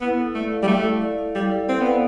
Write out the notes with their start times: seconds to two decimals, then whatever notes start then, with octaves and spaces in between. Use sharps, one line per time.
0.01 B3 E4
0.18 A4
0.35 A3 D5
0.52 F5
0.63 G3
0.68 A3 E4
0.85 A4
1.01 D5
1.18 F5
1.35 G3 E4
1.51 A4
1.69 C4 D5
1.81 B3 F5